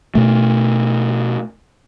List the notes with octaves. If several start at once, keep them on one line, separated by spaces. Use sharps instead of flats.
B2 A3